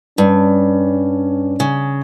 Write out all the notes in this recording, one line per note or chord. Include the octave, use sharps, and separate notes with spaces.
G2 C#4
C#3